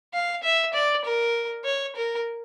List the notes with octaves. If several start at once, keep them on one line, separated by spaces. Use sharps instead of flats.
F5
E5
D5
A#4
C#5
A#4